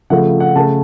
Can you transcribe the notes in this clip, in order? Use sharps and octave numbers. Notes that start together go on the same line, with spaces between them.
C#3 F3 A3 F#5
F#5
C#3 A3 A5